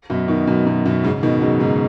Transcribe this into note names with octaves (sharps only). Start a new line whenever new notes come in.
F#2 B2
B2 D#3
F#2 B2
F#2 B2
F#2 B2
G#2 C#3
B2 D#3
C#3 F#3
G#2 C#3